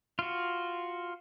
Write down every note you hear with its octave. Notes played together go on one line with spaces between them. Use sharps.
F4 F#4